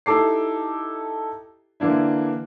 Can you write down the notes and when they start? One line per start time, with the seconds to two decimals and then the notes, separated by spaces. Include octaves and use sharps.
0.06 D#4 E4 G4 A4 D6 C7
1.80 D3 E3 A#3 D4 E4